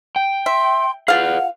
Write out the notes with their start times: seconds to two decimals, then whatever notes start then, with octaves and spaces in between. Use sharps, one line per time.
0.16 G5
0.46 E5 C6
1.08 F4 G#4 B4 F5 F#5